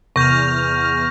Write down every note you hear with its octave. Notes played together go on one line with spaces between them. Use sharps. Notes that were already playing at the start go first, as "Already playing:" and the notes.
E2 C3 C#6 F6 G6 A#6